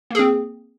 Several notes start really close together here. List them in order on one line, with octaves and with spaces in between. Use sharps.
A#3 G#4 C4